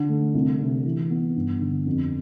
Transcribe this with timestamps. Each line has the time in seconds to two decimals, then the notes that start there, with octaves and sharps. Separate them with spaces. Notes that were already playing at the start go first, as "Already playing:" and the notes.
Already playing: D3
0.08 A3
0.34 C2
0.59 C3
0.85 E3
1.10 B3
1.36 G2
1.61 D3
1.86 F2